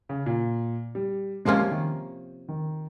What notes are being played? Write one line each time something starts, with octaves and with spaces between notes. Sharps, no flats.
C#3
A#2
G3
C3 F3 G#3 A#3 C#4 F4
G3
D#3
D#3